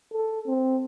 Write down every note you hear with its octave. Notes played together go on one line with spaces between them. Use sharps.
A4
C4